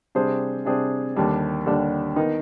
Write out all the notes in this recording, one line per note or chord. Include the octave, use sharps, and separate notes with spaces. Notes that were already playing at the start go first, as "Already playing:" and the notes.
C3 G3 D4 G#4 C5
C3 G3 D4 G#4 C5
D#2 D3 G3 D4
D#2 D3 G3 D4
D#3 B3 D#4